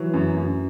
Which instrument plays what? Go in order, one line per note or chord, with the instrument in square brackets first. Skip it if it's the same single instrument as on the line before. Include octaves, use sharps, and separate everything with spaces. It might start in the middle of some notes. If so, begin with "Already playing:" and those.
Already playing: [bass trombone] E3 [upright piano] F#3
[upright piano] F#2
F#2